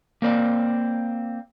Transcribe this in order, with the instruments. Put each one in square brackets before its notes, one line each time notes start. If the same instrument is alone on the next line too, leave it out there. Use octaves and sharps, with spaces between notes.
[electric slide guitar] A#3 C4 D5